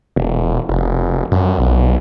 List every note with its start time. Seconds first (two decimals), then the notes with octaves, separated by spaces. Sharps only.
0.16 E1
0.69 F1
1.32 F#2
1.58 B1